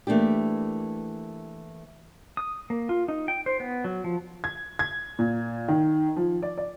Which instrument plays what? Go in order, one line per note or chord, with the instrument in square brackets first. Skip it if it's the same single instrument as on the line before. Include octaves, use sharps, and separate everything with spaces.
[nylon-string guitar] E3 A3 A#3 D4 G4
[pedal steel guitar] D#6
A#3
F4
D#4
G5
C5
B3
F#3
F3
[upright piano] G#6
G#6
A#2
D#3
F3
D5
D5